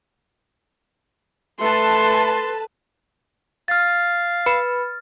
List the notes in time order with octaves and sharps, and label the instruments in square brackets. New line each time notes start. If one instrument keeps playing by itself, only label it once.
[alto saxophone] A3 [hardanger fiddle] A4 [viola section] B4 A5 [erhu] C6
[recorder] F5 [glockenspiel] F6 A6
[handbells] B4 B5 C#7